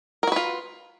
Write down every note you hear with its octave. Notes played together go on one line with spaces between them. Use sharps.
F4 F#4 A#4 B4